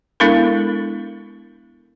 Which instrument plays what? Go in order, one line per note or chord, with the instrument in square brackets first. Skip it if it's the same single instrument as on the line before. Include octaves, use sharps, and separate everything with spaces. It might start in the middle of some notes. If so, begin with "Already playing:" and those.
[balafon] G#3 B3 D4 E4 A4 A#4